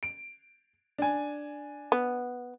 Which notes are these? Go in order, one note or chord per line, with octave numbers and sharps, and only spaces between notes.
D7
D4 G#5
B3